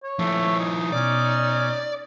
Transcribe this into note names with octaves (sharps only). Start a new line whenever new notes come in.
C#5
F3 A3 E4
D#4
B2 C#4 D5